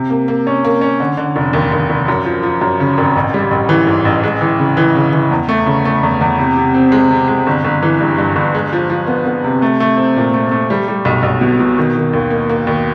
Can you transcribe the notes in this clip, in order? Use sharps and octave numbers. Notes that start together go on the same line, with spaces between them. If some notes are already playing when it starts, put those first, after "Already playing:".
Already playing: C3
A#3
A#3
C#4
A#3
C#4
D3
D3
F1
D#2
D#2
F1
F#2
F3
F3
F#2
C#3
G#1
A1
G3
A1
E3
G#2
A1
G#3
E3
C#3
E3
C#3
E3
E2
A3
C#3
A3
E2
E2
C3
C3
C4
G#3
C3
G#3
G1
G1
E3
G2
G2
G1
G#3
F3
F3
B3
B3
C3
A3
A3
C4
A#2
A3
A3
G3
G3
B1
B1
B2
B2
D#3
D#3
D#2
A#3
A#3
D#2